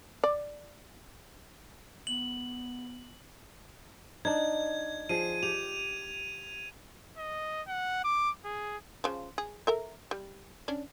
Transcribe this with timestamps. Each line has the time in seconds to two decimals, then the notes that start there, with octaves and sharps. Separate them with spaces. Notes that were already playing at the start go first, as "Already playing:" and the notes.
0.24 D5
2.07 B3 F#7
4.25 D4 D#4 G#6
5.09 F3 G#4 D#7
5.43 G4 F7
7.18 D#5
7.68 F#5
8.04 D6
8.45 G#4
9.04 C#3 F3
9.38 G#4
9.67 A4 A#4 E5
10.11 G3
10.68 C#4 D4 D5